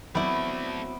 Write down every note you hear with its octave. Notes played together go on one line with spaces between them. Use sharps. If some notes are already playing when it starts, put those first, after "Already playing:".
F#3 G3 A3 B3 C4 E4 D5